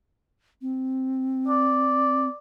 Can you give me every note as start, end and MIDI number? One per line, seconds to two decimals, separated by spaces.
0.62 2.28 60
1.48 2.38 74